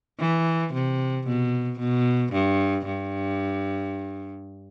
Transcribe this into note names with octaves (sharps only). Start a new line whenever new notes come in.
E3
C3
B2
B2
G2
G2